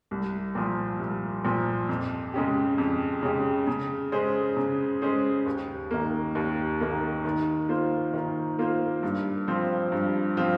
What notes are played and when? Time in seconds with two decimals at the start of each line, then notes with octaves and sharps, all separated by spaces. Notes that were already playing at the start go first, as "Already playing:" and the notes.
0.11 C2
0.55 A#2 F3
1.00 C2
1.45 A#2 F3
1.89 F2
2.34 C#3 G#3 C#4 G4
2.78 F2
3.23 C#3 G#3 C#4 G4
3.67 C#3
4.12 G#3 C#4 G#4 C5
4.57 C#3
5.02 G#3 C#4 G#4 C5
5.46 D#2
5.91 D#3 A#3
6.35 D#2
6.81 D#3 A#3
7.25 D#3
7.69 A#3 F4 C5
8.14 D#3
8.59 A#3 F4 C5
9.03 G2
9.47 F3 C4 F4 C5
9.92 G2
10.37 F3 C4 F4 C5